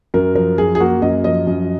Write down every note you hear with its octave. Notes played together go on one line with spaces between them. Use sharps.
F#2 A#4
F3 A#4
F#2 G#4
G#4
A#3 F#4
F#2 D#5
F3 D#5
F#2